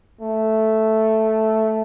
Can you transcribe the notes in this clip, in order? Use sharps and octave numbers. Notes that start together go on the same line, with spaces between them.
A3